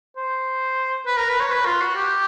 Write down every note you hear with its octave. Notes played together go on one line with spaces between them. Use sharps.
C5
B4
A#4
B4
C#5
B4
F4
F#4
G4